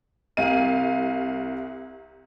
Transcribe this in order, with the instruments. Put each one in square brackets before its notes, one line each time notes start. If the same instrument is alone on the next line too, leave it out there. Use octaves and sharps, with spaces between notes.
[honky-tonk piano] C2 F5 D#7